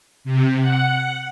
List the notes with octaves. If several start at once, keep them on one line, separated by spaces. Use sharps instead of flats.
C3
F#5